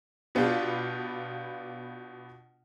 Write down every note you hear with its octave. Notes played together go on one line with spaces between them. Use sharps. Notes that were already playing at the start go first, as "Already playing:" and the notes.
B2 B3 D4 F4 G4